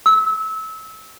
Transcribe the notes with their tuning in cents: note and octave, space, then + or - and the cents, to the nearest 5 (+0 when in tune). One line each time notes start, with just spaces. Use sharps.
E6 -25